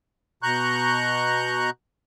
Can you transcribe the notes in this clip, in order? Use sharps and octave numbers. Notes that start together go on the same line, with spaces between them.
B2 A#5 C#6 F#6 G6